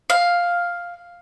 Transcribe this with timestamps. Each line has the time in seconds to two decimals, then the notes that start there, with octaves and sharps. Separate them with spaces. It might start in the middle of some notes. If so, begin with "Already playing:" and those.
0.10 F5